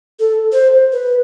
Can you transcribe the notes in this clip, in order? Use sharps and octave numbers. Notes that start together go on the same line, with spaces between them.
A4
C5
B4